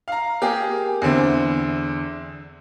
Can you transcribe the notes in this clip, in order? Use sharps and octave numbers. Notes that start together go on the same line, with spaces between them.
F5 A#5
A#3 G4 G#4
E2 D3 C4 E4